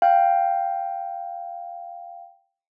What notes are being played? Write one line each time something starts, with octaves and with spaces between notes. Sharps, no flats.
F5 G5